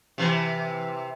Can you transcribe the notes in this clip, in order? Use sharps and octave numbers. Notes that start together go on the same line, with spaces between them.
C3 E3